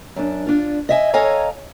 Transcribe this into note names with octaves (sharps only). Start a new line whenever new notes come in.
F#2 D4
D4 F4
D#5 E5 G#5
A4 C#5 D#5 F5 G#5 A#5